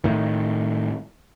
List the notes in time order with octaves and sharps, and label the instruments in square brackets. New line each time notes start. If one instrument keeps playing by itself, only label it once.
[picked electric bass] A2 D#3